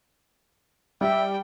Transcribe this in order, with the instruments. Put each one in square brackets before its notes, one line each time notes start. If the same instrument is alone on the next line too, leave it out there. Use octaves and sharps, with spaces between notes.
[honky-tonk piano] G3 [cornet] E5 [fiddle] G5